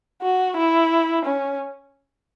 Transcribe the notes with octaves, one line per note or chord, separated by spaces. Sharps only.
F#4
E4
C#4